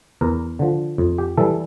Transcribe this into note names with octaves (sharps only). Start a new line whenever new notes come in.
E2 A#4
D3 F3
F2
G4
E3 G3 A4